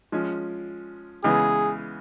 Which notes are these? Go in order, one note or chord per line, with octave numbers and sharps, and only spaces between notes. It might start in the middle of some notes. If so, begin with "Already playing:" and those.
F3 G#3 C#4
C#3 E3 G#3 B3 G#4